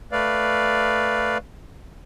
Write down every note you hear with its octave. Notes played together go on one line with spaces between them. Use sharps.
A3 B4 D5 F5